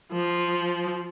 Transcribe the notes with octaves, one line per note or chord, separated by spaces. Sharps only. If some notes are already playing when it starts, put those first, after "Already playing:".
F3